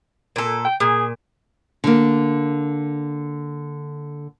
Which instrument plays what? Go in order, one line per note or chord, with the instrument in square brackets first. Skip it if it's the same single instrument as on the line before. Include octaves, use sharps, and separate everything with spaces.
[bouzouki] A#2 A4
[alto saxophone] G5
[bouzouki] A#2 [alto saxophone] G#4
[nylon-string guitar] D3 A#3